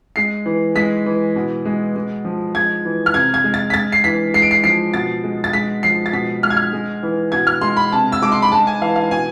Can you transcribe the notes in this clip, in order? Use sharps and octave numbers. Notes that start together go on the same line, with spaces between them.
G#3 C7
E3
G#3 B6
E3
B2
G#3
G#3
F3
G#3 G#6
E3
F6
C3 G#6
G#6
G#3
A6
B6
G#3 A6
C7
E3 B6
G#3 C7
D7
C7
F3 C7
B2 A6
G#3
A6
G#3 B6
F3 C7
A6
B2 B6
G#3 F6
G#6
F6
G#3
E3
B2 G#6
F6
G#3 C6
B5
C3 A5
E6
G#3 D6
C6
B5
G#3 A5
G#5
E3 F5
F5
B2 G#5